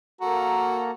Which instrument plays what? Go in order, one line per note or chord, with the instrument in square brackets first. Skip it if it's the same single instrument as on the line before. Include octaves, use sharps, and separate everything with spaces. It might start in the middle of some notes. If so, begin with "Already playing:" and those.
[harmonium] A#3 A4 A#5 [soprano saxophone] F#4